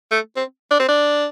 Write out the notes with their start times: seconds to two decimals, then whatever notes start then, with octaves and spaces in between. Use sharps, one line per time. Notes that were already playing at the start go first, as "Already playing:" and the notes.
0.11 A3
0.36 C4
0.71 D4
0.79 C4
0.88 D4